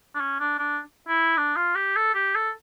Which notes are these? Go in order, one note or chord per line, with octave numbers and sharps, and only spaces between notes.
D4
C#4
D4
D4
E4
D4
F4
G4
A4
G4
A4